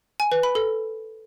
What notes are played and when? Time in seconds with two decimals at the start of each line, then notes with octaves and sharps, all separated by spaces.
0.20 G#5
0.32 B4
0.43 B5
0.55 A4